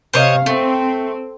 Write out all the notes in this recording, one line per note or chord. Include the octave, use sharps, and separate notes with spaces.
C3 C5 C#5 D#5 F5
A3 C4